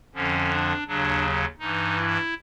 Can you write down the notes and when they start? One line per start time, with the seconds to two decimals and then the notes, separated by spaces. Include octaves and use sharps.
0.15 F2 D3 F3 C#4
0.51 D4
0.87 D#2 C#3 F#3 D4
1.59 G2 E3 D#4
1.96 E4